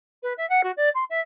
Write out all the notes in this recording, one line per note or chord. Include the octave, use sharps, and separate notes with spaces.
B4
E5
F#5
F#4
D5
C6
E5